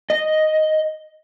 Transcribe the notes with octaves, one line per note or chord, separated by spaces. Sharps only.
D#5